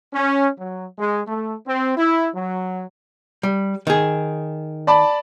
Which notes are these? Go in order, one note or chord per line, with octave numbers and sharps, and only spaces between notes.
C#4
F#3
G#3
A3
C4
E4
F#3
G3
D#3 G#4
D5 A5 B5